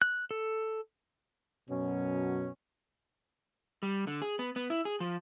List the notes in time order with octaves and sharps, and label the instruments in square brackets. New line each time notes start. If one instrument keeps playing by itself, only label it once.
[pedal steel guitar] F#6
A4
[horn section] F#2 B2 F#3 C#4
[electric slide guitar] G3
D3
G#4
B3
B3
E4
G#4
F3